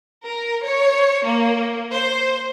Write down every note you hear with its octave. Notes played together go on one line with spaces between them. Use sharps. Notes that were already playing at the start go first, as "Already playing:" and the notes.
A#4
C#5
A#3
C5